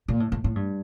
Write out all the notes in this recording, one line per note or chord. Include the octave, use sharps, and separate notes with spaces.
A#2
A2
A2
A2
G2